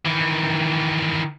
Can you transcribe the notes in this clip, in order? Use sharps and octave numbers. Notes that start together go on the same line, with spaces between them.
D#3 E3